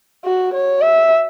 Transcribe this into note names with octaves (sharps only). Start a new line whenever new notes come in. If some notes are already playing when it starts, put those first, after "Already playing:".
F#4
C#5
E5